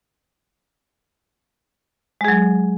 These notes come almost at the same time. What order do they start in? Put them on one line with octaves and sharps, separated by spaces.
G#3 G#4 F#3